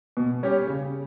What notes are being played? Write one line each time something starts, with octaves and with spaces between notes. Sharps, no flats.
B2
G3 C#4 G4 C#5
C#3